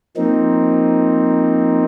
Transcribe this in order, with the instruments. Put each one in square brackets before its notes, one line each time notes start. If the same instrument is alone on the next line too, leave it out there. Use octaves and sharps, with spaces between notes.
[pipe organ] F3 A#3 C4 D#4